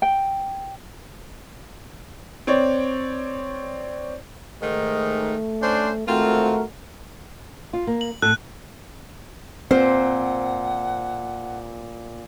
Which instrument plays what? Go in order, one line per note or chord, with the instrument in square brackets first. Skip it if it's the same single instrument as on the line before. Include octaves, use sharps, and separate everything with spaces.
[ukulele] G5
[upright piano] C4 C#5 D5
[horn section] G#2 D#3 [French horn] A3
[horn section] C#4 D4 C5
[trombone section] G#1 F#4 A#4 [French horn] A3 [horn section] C4 F4
[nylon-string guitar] F4
A#3
[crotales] F#7
[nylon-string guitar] A2 A4 [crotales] F#6
[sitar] A#2 [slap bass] C4 [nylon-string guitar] C5 [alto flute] F#5